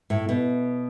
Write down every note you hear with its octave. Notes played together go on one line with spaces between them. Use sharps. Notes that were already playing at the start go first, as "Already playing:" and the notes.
A2
B2